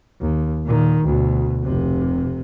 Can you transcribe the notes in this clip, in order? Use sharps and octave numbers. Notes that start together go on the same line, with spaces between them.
D#2
A#2 D#3
D2 B2
F1 C3